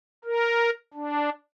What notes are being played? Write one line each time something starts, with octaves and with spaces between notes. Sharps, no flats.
A#4
D4